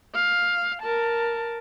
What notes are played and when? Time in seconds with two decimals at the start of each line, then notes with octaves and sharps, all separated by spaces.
0.15 F5
0.82 A#4 A5